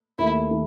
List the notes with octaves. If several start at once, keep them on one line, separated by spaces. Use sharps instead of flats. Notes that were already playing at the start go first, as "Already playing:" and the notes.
D#2 D#3 A3 E4
D#3 A3